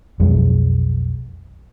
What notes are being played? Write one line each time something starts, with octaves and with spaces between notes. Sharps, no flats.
B1 F2 G#3